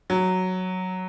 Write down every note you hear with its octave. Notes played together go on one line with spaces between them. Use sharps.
F#3